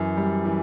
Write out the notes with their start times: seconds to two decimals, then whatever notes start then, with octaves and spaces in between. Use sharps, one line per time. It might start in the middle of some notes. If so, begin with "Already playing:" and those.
Already playing: F#2 E3
0.17 G3
0.45 E3